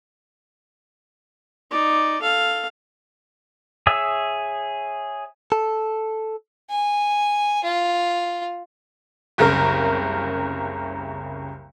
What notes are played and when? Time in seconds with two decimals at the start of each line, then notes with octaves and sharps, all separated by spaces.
1.71 D#4 D5
2.21 A4 F5
3.87 G#4 C#5 E5 D#6 E6
5.52 A4
6.70 G#5
7.63 F4
9.38 F#1 C2 C#3 A#4 F6